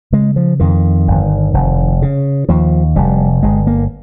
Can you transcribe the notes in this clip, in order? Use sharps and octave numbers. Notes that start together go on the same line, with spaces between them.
C#3 G#3
F3
F2 D#3
G1
F1
C#3
D#2 F3
F1 G3
G1 G#3
A#3